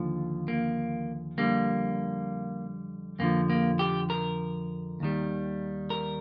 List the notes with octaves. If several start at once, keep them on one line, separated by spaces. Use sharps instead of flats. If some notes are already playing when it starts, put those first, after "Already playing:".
Already playing: D#2 D3 F3
A#3
F2 D3 G3 A#3
F2 D3 F3 A#3
A#3
G4
A#4
D#2 D#3 G3
A#4